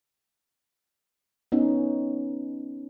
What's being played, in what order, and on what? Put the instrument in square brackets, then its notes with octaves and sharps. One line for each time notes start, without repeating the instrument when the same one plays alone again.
[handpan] B3 C#4 D#4